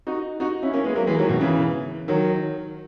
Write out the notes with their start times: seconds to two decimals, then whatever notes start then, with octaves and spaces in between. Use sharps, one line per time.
0.07 D#4 F#4
0.40 D#4 F#4
0.63 C#4 E4
0.73 A#3 C#4
0.84 G#3 B3
0.95 F#3 A#3
1.07 E3 G#3
1.19 D#3 F#3
1.29 B2 D#3
1.41 C#3 E3
2.08 D#3 F#3